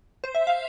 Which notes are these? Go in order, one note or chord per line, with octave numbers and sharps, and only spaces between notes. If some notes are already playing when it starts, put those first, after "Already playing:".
C5
E5
F5